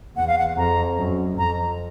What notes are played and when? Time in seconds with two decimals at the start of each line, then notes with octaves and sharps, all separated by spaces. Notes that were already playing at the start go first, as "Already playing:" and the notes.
0.16 E2 F#5
0.27 F5
0.38 F#5
0.57 F2 A#5
0.98 F#2
1.37 F2 A#5